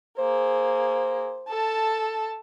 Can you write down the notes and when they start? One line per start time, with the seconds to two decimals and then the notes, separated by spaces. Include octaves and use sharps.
0.18 A#3 G#4 C5
1.49 A4 A5